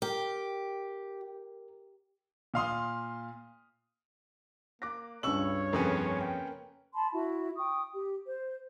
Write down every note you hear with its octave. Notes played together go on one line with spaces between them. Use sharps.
G4 A#4
A#2 F5 C6 D#6
A#3 D6 F#6 A#6
C#2 G2 C#5 C#6 E6 F#7
F2 C#3 A#3 C#4 B4
G5
A5 B5 C6
E4 F#4
G5 C#6 D#6
G4
C5